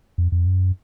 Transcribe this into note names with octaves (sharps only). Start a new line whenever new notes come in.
F2
F2
F#2